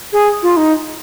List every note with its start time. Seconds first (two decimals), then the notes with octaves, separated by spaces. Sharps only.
0.12 G#4
0.42 F4
0.56 D#4